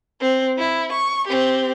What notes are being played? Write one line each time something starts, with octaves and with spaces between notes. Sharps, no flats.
C4
E4
C#6
C4 G4